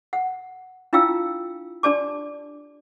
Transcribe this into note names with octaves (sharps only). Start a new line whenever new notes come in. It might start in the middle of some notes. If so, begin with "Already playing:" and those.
F#5
D4 E4 F4 F5 G5 E6
D4 G4 D5 A5 D6